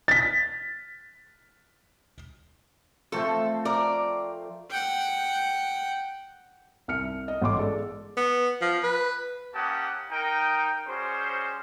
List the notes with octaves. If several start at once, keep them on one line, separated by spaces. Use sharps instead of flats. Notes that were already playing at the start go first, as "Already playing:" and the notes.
A6 B6
F3 A3 C4 A4
A#4 D5
F#5 G5
C2 F6 C#7
D#5
A1 C#4 C6 D6
G#3 A4 D5
B3
F3
B4
A#3 C#4 G4 F#5 A5 D#6
D#4 A#4 G5
G3 C#4 F#4 G#4 C5